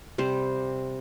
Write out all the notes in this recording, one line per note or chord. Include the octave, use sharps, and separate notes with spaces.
C3 G3 C5